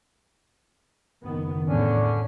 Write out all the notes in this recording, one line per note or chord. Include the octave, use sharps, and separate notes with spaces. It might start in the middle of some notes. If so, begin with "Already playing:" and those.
F#1 D#3 B3
E2 A2 D3 C#4 D4